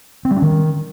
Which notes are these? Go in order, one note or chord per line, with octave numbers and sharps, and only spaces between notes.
C4
G3
C#4
D#3